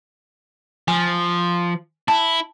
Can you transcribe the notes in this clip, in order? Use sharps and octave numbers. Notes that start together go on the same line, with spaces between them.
F3 G#5
E4 A5